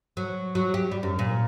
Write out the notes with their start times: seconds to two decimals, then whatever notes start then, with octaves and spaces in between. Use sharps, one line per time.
0.17 F#3
0.55 F#3
0.74 G4
0.92 G3
1.03 F#2
1.19 A#2